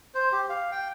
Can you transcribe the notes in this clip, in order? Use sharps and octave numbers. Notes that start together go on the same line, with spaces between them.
C5
G4
F5
G5